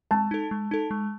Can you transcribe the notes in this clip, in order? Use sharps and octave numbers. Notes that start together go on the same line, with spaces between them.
G#3 A5
D#4 A4
G#3
D#4 A4
G#3